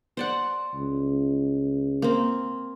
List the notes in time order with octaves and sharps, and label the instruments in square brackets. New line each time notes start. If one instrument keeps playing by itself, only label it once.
[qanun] C5 D5 F#5
[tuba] C#2
[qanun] A#3 C4